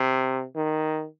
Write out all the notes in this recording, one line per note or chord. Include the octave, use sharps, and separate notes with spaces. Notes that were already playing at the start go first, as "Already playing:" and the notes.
Already playing: C3
D#3